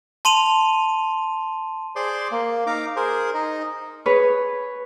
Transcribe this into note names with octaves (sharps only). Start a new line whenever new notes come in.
A5 C6 D#7 F7
G#4 C5 D5 C6 D6
A#3
D#4 F5 A#5 D6
G#4 A#4 C5
D#4 D#5
G#4 B4 C#5